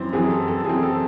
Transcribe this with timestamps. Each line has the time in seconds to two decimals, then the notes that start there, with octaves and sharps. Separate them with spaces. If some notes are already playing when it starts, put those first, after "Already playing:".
Already playing: F#2 E3 C4 C5
0.13 F#2 E3 C4 G#4
0.30 A4
0.48 A4
0.65 F#2 E3 C4 G#4
0.83 A4